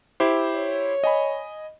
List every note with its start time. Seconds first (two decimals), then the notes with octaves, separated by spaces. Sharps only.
0.20 E4 G4 C5
0.55 C#5
1.04 D#5 G#5 B5